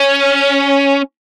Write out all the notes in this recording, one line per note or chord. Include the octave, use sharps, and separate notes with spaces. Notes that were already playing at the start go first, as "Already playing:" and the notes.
Already playing: C#4